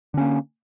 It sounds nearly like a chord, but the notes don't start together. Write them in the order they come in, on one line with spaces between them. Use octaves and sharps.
D3 C#4 A#3